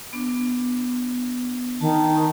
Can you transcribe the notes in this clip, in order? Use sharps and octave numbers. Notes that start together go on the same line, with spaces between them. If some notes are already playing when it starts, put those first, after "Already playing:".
B3 D4
D#3 A5